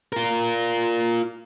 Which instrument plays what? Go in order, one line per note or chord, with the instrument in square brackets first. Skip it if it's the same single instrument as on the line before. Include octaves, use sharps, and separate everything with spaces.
[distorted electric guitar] F4 A#4